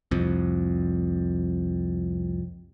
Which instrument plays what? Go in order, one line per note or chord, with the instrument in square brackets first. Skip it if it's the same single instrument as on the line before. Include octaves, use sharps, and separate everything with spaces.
[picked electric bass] C2 F2